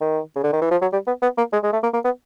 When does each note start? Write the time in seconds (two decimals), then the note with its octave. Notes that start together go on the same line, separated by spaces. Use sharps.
0.01 D#3
0.36 C#3
0.44 D3
0.53 D#3
0.62 E3
0.71 F3
0.82 F#3
0.93 G3
1.07 B3
1.22 B3
1.38 A#3
1.53 G#3
1.64 G#3
1.73 A3
1.83 A#3
1.94 A#3
2.05 B3